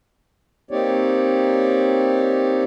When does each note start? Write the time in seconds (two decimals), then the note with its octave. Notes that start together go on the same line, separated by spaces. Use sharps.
0.71 A#3 C4 D#4 G4 C#5 D5